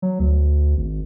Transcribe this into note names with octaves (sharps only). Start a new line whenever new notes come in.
F#3
D2
G#1